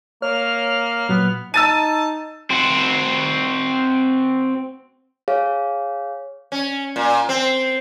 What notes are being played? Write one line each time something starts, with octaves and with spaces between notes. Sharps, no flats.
A#3 C#5 F6
A#2 F#3 B3
D#4 A5 E6 A6 D#7
C4 F#4
G#4 C#5 F5
C#4
A#2
C4